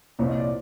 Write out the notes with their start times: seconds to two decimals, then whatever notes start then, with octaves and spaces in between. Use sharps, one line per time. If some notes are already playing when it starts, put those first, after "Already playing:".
0.19 C2 A#2 F3 C#5
0.28 D#5
0.37 D5